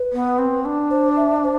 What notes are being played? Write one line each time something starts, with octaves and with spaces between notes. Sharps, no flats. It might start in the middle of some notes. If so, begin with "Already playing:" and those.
Already playing: B4
B3
C4
D4
C5
E5
C5